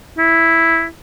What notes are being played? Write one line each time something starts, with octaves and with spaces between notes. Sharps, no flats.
E4